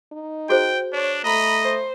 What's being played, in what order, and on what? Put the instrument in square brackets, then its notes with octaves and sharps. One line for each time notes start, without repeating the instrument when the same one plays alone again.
[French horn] D#4
[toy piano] F#4 G#4 C5 [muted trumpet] G5
[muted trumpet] D4 [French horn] C#5
[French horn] A3 [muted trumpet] D#5 [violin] A#5 B5
[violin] C5